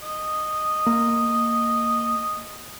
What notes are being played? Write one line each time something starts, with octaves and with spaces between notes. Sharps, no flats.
D#5
A#3